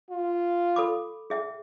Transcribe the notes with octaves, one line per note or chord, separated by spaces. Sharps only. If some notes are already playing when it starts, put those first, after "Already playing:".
F4
A4 B5 D6
G#4 E5 G5